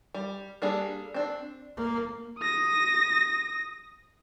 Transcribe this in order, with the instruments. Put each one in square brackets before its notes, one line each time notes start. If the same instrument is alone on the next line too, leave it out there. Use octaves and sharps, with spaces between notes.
[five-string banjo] G3
G3 A#3 D4 G#4 A4
C4 D4
[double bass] A#3
[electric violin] D#6 A#6